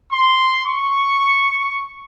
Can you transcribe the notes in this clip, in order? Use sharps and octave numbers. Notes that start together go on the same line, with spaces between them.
C6
C#6